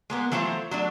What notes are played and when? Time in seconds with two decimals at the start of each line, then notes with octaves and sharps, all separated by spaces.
0.10 G#3 A#3 B3
0.32 E3 F#3 A3 F4 C5
0.71 F#3 A3 D4